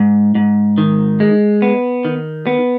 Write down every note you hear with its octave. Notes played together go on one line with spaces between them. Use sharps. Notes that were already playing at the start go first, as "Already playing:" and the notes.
Already playing: G#2
G#2
D#3
G#3
B3
D#3
B3